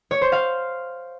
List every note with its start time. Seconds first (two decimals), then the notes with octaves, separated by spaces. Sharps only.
0.11 C#5
0.22 C5
0.32 F5